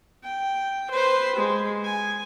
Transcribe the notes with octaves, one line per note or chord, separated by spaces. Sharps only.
G5
B4 C5
G#3
G#5